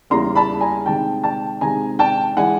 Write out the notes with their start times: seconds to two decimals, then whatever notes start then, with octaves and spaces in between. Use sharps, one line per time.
0.10 E2 C#3 E3 G3 A#3 A#5 C6
0.35 A5 B5
0.61 G#5 A#5
0.86 C3 D#3 G#3 G5 A5
1.24 G5 A5
1.61 C3 D#3 G#3 G#5 A#5
1.99 G5 A5
2.37 E3 G#3 F#5 G#5